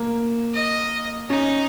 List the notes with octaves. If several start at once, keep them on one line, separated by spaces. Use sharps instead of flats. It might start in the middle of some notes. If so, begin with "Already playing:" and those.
Already playing: A#3
D#5
C#4 D#4